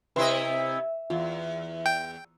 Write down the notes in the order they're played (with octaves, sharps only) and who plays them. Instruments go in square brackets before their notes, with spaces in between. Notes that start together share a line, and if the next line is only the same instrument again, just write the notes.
[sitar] C3 E4 D#5 [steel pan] B4 C6 [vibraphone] E5
[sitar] E2 [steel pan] F4
[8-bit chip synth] G5